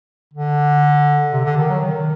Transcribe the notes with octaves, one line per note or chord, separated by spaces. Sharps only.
D3
C3
D3
D#3
F#3
D#3